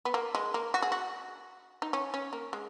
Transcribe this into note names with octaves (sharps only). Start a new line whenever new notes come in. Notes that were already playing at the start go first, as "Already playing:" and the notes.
B3
A#3
G#3
A#3
F#4
G#4
F#4
D#4
C#4
C#4
A#3
G#3